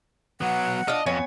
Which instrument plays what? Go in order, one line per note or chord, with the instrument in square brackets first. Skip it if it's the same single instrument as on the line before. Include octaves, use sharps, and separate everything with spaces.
[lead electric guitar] F#3 B3 [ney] F#5
[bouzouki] D4 F4 [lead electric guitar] D#5
[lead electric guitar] F2 [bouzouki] B3 C#5 G#5